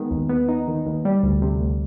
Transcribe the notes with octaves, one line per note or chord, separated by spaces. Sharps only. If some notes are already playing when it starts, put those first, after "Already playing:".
Already playing: D#3 G#3 B3
D#2
B3
D#4
D#3
D#2
G3
D2
C3
D2